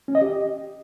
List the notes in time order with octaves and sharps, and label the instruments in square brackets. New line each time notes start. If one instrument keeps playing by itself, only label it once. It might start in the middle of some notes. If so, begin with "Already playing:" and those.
[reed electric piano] C#4
D#5
G4